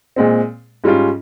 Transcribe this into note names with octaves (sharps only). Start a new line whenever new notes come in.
A#2 G#3 C4
G#2 G3 C#4 F4